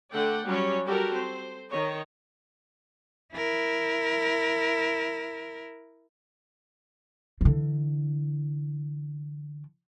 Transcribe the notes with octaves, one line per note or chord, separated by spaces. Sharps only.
D3 A3 D5 F#5 G5
F#3 G3 C#4 C#5
G3 F#4 G4 A4 A#4
C4 C5
D#3 C#5 D#5
E4 A#4
D3 E3